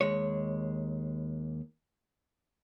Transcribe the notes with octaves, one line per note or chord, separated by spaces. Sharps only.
D#2 G#3 C#5